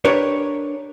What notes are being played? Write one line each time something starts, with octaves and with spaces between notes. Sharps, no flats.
D4 G4 A#4 B4 C#5